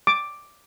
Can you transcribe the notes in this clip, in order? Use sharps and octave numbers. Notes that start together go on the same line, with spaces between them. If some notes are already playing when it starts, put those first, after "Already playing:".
D6